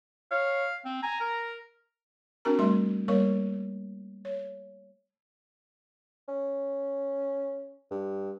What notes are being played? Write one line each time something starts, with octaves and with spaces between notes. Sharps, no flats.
C#5 F5
C4
G#5 A#5
A#4
C4 D4 F#4 A#4 A#5
G3 A3 E5 C6
G3 A#3 A#4 C#5 C#6
C#5
C#4
G2